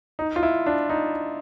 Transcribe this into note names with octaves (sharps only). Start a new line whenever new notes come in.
D#4
F4
E4
D4
D#4